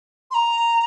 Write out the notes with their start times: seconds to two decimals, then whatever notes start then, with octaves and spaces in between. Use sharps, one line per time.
0.31 C6
0.34 A#5